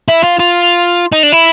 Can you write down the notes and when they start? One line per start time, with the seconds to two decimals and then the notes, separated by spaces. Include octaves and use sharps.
0.08 E4
0.23 F4
0.39 F4
1.12 D#4
1.23 D4
1.32 E4